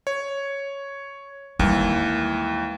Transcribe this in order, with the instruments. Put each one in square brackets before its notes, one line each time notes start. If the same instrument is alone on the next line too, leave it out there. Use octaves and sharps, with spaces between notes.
[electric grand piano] C#5
[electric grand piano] D#2 E3 [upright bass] G3 G#3